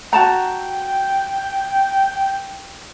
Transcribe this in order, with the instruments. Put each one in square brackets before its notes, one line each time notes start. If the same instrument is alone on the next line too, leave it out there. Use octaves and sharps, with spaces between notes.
[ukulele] F#4 A5 A#5 [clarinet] G5